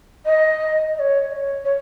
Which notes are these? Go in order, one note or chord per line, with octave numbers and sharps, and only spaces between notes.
D#5
D#5
C#5
D#5
C#5
C#5